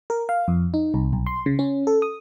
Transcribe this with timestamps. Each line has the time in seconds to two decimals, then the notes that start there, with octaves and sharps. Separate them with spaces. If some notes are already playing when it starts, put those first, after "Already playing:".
0.10 A#4
0.29 F5
0.48 F2
0.74 D#4
0.94 C2
1.13 B1
1.26 C6
1.46 C#3
1.59 C#4
1.87 A4
2.02 D#6